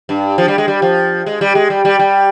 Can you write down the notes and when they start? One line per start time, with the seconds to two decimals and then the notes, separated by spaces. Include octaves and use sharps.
0.09 G2
0.38 F3
0.48 G3
0.58 G#3
0.68 G3
0.82 F3
1.26 G#3
1.41 G3
1.55 G#3
1.70 G3
1.85 G3
1.99 G3